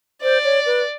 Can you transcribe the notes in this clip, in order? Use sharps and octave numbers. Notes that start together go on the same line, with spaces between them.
C5 D5
C#5
B4